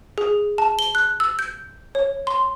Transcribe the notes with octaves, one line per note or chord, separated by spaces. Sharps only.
G#4
A5
G7
F#6
E6
G6
C#5
C6